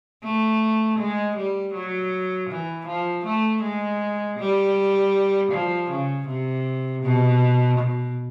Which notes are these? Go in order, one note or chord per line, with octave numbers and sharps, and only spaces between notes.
A3
G#3
G3
F#3
E3
F3
A3
G#3
G3
F3
C#3
C3
B2
B2